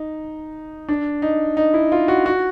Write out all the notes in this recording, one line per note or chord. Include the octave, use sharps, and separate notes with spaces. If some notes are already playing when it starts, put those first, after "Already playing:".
Already playing: D#4
D4
D#4
D#4
E4
F4
F#4
F#4